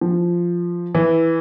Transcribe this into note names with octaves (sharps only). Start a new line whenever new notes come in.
F3
E3